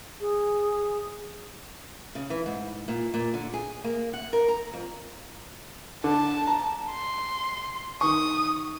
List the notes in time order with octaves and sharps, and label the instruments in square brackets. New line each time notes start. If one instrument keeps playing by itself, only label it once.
[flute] G#4
[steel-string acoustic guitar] C#3
E3
G#2
A#2
A#2
D3
G#4
A#3
F#5
A#4
A#5
F2
[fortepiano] D3 [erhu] A5
[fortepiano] A#5
[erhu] C6
[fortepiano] D#3 C#6 [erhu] D#6